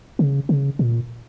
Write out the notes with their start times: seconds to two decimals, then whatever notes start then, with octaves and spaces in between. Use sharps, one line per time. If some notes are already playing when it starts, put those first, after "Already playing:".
0.19 C#3
0.49 C#3
0.79 A#2